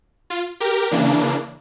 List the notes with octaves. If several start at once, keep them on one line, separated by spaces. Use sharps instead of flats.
F4
G4 A#4
C#3 E3 A#3 D4